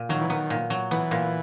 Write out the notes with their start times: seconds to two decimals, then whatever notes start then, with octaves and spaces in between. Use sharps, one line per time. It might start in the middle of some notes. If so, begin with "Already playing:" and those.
Already playing: A#2
0.09 D#3 F#3
0.21 E3
0.30 D#3 B3
0.50 A#2
0.70 F#3
0.91 E3 B3
1.11 A#2